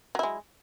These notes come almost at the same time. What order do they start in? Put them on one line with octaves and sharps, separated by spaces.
F#3 E4 G#3